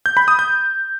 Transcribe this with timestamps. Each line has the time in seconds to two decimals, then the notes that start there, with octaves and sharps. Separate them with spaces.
0.06 G6
0.17 B5
0.28 D#6
0.39 G6